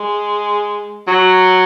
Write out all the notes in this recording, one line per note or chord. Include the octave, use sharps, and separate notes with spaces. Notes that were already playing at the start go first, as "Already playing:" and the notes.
Already playing: G#3
F#3